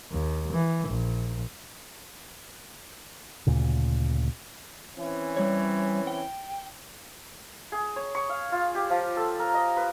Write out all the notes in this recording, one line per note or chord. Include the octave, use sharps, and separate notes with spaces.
D#2
E3
A#1
D2 A#2 C#3
E3 C4 C#4
G3 C#5
G5
G#4
C#5
C#6
F5
F4
G4
F3
A4
A#4
D#5
B4